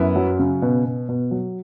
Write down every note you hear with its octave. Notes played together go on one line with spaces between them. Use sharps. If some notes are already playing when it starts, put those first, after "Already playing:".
Already playing: F#2 B3 E4
F#3
C#3
B2
B2
B2
F#3